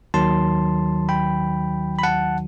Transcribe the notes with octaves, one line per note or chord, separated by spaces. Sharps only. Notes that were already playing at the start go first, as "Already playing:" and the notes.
D#2 D#3 F#3 A5 C6
G5 B5
B5
F#5 A5